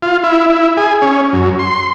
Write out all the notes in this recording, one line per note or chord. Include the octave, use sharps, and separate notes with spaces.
F4
E4
E4
G#4
C#4
F#2
C6